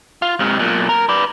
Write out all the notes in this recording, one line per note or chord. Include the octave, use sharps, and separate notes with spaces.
F4
G#2 C3
B1 A#2
A#4
B4 D5